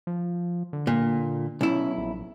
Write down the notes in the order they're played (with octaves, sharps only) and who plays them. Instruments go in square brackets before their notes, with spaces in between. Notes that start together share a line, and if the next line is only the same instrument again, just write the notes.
[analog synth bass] F3
D3
[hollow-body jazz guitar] A#2
[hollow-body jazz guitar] B1 E4 [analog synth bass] C#4
[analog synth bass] A#1